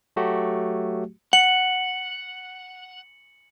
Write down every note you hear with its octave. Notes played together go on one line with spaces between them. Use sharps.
F#3 A3 F#4 G4
F#5 C#7 F#7